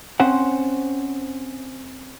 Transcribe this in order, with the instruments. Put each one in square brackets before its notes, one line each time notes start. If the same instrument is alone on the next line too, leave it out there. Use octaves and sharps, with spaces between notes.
[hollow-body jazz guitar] C4 C#4 C5 F#5